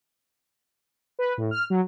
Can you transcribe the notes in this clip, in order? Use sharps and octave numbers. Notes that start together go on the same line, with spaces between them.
B4
A2
F6
F#3